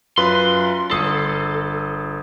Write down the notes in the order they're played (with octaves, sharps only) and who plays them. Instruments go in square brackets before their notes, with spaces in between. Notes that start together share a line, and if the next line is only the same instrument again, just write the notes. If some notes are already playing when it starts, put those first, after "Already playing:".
[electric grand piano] F#2 F4 B4 [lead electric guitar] C6
[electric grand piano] G1 D#6 C7 [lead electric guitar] A4